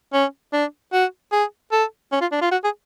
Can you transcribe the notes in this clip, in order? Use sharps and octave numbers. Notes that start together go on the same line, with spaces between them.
C#4
D4
F#4
G#4
A4
C#4
F4
D4
F4
F#4
G#4